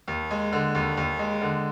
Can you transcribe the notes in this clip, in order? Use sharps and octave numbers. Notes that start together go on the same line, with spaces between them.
D#2
G#3
D3
D#2
D#2
G#3
D3